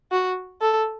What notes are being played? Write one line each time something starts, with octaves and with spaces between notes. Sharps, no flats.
F#4
A4